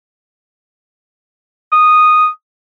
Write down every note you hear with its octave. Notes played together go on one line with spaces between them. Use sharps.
D#6